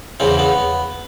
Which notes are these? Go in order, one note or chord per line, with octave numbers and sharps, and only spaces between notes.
E2 C#3 E3 C4
B3